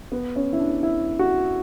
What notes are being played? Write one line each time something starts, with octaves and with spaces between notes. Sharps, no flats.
B3
C#4
E4
D4
E4
F#4